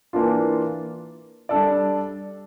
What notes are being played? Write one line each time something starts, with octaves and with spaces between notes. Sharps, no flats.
E3 A#3 D4 F4
G3 D4 A4 D5